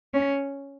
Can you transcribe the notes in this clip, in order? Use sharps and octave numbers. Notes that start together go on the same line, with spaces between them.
C#4